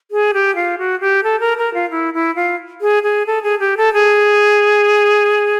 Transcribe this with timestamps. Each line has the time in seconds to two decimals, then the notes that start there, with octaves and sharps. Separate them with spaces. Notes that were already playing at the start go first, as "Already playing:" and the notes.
0.11 G#4
0.34 G4
0.56 F4
0.78 F#4
1.00 G4
1.23 A4
1.40 A#4
1.58 A#4
1.74 F4
1.90 E4
2.14 E4
2.36 F4
2.81 G#4
3.03 G#4
3.27 A4
3.43 G#4
3.60 G4
3.77 A4
3.94 G#4